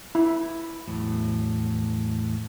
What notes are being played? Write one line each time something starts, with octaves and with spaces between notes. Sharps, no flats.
E4
E2 A2 F#3